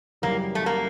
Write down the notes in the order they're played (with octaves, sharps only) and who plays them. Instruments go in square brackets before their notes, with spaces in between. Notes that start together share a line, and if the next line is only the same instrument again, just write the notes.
[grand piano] F#2 C#3 E3 G3 [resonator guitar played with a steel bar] A#3
[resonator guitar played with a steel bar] A3
A#3